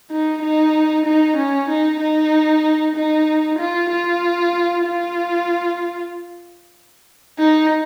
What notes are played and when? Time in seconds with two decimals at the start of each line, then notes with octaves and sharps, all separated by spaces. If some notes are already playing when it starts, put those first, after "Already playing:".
0.11 D#4
0.42 D#4
1.06 D#4
1.37 C#4
1.69 D#4
2.00 D#4
2.96 D#4
3.59 F4
3.90 F4
4.85 F4
7.39 D#4